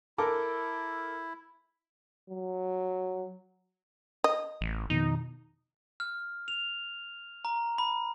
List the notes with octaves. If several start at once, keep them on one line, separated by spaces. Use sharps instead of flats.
E4 A4 A#4 D6
F#3
D#5
A1
F2 B2 D#3 D#4
F6
F7
A#5
B5